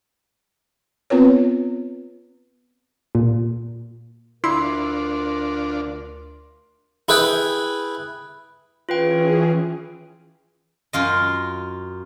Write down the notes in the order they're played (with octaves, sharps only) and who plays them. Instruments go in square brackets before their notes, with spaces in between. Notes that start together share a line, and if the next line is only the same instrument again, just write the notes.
[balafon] B3 C4 F4 B4 C#5
[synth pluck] A#2
[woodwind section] D2 A#4 [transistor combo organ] D3 D4 F4 [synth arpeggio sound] E4 [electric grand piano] C6
[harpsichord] E4 G#4 B4 E5 G5
[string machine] E3 C#4 G#4 [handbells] F4 B4 G5
[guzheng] F#2 F4 D#5